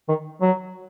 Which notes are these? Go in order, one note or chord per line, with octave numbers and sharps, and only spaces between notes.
D#3
F#3